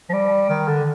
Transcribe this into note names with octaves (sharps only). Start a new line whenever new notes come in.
F3
G3
D#3
D3